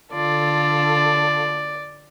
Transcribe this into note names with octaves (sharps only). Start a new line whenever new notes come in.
D3 F4 A4 D5